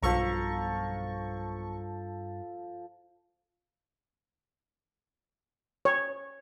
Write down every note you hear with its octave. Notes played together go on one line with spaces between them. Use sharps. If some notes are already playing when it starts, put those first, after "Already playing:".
B1 G2 F3 A4 A#5 C#6
C#5